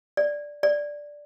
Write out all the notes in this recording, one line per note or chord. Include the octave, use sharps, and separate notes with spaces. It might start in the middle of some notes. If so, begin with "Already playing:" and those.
D5
D5